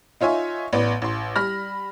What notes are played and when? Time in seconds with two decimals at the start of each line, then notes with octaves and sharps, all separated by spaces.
0.21 D#4 F4 C#5 E5 G#5
0.73 A1 B3 D5
1.02 A1 C6
1.36 G3 B5 F6 A#6